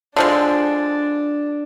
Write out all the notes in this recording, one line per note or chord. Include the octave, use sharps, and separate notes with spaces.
D3 F3 G#3 D4